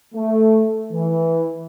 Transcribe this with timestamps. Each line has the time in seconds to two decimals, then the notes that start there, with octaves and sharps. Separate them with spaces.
0.15 A3
0.93 E3